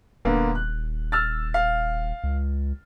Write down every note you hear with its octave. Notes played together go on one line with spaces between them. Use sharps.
D#1 D3 A#3 B3
F#6
E6 F6 A6
F5
C#2